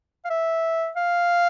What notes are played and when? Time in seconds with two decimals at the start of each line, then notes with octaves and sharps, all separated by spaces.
0.25 F5
0.30 E5
0.96 F5